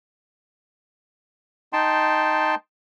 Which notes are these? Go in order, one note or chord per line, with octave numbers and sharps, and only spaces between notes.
D#4 G5 A5 C6